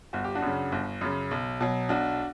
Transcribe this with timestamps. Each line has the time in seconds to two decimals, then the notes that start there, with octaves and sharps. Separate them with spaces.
0.13 G1 F#4
0.24 G4
0.35 D4 F#4
0.42 F#2 C#3
0.72 G1
1.01 F#2 C#3
1.31 B1
1.61 B2 F#3
1.89 B1 D4 F#4